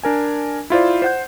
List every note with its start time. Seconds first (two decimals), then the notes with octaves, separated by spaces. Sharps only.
0.03 D4 A#4 G#5
0.70 E4 F4 C5 D5
1.02 C5 F#5 G6